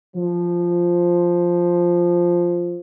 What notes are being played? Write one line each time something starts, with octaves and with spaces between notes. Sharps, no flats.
F3